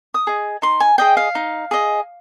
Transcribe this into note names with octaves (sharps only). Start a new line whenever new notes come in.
D#6
G#4 D#5
D#4 C6
G#5
G#4 D#5 G5
F5
D#4
G#4 D#5